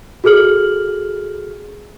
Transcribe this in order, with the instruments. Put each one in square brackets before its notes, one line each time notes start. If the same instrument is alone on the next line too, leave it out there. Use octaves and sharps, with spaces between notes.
[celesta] F#4 G#4 A4 F6 F#7